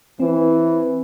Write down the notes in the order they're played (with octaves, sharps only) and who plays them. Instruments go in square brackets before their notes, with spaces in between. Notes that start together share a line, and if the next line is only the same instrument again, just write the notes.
[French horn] E3 [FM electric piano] C4